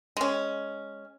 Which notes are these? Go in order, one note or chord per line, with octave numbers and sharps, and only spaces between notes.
G#3 C#4